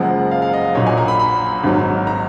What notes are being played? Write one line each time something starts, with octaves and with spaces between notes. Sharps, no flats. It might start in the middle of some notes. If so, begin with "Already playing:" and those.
Already playing: F#1 F#2 F3 G#3 F#5
F5
F5
D#5
A#1 A#2 F#3 C#5
G#5
A#5
B5
B5
G#1 G#2 F#3
A#5